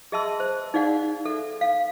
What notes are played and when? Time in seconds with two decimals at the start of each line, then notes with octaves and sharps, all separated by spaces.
0.12 G#4 D#5 E5 A5 C6 E6
0.40 C5
0.74 D#4 G#4 D5 F5 F#5
1.25 A4 E5
1.61 F5